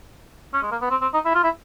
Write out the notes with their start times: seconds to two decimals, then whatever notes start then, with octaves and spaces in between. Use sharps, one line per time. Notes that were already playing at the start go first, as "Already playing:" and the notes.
0.54 C#4
0.63 G#3
0.71 A#3
0.82 B3
0.90 C4
1.02 C4
1.14 D#4
1.25 E4
1.35 F4
1.44 E4